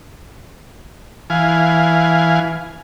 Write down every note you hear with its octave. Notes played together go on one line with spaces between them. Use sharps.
E3 F5 G#5